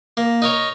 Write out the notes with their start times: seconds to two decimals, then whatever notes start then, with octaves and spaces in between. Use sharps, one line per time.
0.17 A#3
0.42 D#4 A#4 C#5